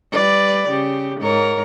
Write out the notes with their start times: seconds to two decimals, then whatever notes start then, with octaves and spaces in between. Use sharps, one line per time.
0.12 G3 B4 D5
0.69 C#3 G4
1.21 G#2 A#4 C#5